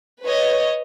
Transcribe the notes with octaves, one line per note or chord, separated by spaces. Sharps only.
B4 C#5 D#5